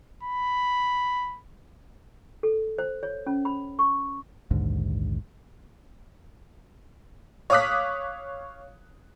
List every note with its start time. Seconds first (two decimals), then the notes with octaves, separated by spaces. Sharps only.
0.23 B5
2.43 A4
2.78 C5
3.03 C#5
3.27 C#4
3.45 B5
3.79 C#6
4.51 A#1 D#2 G#2 D3
7.50 C#5 F5 D6 D#6 F#6 B6